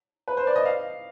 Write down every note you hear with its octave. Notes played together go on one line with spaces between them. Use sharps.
B4
C5
D5
D#5
F5